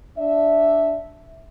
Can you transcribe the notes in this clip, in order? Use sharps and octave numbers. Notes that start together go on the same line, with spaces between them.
D4 E5